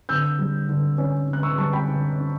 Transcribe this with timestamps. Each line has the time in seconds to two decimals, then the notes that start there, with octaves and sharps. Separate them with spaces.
0.09 D3 E6 G6
0.39 G3
0.69 D3
0.98 C#4
1.28 D3 F#6
1.43 C#6 E6
1.58 G3 A5 C#6
1.73 G5 B5
1.88 D3
2.18 C#4